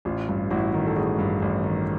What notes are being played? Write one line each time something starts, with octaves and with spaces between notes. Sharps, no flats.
A1 F4
G2
A1 E4 F#4
D#3
A4
A1 F#4 G#4
G2
A1
D#3